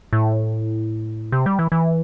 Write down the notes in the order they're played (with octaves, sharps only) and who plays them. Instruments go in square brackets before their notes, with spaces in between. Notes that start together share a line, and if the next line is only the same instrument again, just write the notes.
[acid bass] A2
C3
G3
E3
E3